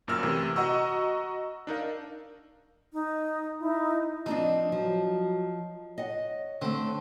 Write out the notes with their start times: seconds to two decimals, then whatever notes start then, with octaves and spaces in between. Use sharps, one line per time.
0.07 G1 F#2 A#2 A#4 E6 F6
0.23 C3 E3 A3
0.56 F#4 D#5 F#5 A#5 C#6 E6
1.67 D4 D#4 A#4 F5
2.93 D#4
3.61 D#4 E4
4.26 F3 C4 D4 D#4
4.72 F3 F#3
5.98 C#5 D#5 F#5
6.61 D3 A3 C4